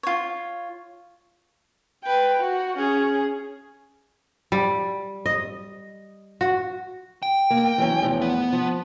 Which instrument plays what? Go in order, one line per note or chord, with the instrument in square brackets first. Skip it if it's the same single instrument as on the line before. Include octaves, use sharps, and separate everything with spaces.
[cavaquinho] F4 C#5
[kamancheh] B4 G5
F#4
C#4 G#4
[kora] G3
D#5
F#4
[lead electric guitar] G5
[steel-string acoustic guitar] A#3
E3 F#3 C#4
E2 A2 F3
[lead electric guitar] B3
[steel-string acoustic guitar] F3